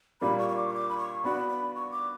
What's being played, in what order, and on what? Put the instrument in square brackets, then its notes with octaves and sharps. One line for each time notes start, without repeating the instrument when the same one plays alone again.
[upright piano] A#2 G3 A#3 D4 [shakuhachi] B5
[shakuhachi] C#6
C#6
D6
C#6
D6
B5
C#6
[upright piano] B3 D4 F#4 [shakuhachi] B5
[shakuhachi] B5
C#6
D6